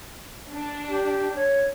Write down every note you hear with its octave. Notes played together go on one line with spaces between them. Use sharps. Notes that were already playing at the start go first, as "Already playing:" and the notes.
D4
G4
C#5